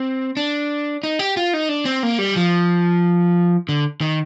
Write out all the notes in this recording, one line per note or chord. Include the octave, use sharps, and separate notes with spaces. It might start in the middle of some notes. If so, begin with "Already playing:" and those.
Already playing: C4
D4
D#4
G4
F4
D#4
D4
C4
A#3
G3
F3
D3
D#3